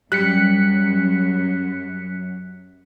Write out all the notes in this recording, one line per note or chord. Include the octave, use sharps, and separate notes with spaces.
F#2 G3 F#6 B6 C#7